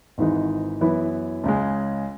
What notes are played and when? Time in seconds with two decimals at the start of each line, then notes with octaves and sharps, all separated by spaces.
0.18 G#1 G#2 E3 G#3 D#4
0.81 F#2 E3 B3 E4
1.44 C#2 C#3 G#3